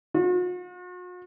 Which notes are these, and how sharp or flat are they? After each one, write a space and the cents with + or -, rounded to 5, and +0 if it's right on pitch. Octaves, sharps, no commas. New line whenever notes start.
F#4 -45